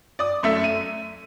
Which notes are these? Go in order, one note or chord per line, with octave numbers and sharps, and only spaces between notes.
D5 D#6
F#2 A3 E5
D#7